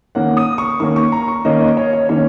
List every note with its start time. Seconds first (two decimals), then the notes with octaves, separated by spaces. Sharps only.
0.15 D#3 A#3 C#4 F#5
0.37 D#6
0.58 C#6
0.80 D#3 A#3 C#4 C#6
0.96 C#6
1.12 A#5
1.28 C#6
1.45 D#3 A#3 C#4 D#5
1.61 D#5
1.77 C#5
1.93 C#5
2.09 D#3 A#3 C#4 C#5